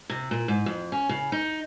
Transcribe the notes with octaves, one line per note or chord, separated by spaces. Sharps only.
C3
A#2
G#2
F2
C#4
C#3
D#4